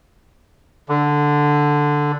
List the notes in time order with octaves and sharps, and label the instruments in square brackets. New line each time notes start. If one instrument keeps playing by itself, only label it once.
[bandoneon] D3